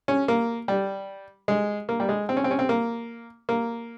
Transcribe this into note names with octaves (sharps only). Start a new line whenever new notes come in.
C#4
A#3
G3
G#3
A#3
G3
G#3
C4
C#4
C4
C#4
C4
A#3
A#3